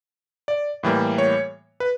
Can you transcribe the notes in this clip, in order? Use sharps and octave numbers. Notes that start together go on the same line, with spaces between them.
D5
A2 E3 G3 A#3
C#5
B4